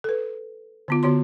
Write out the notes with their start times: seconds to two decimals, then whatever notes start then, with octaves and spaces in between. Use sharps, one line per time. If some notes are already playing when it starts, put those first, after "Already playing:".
0.04 A4 B4
0.88 D3 B3 F4
1.03 D3 B3 F#4 C#5 C6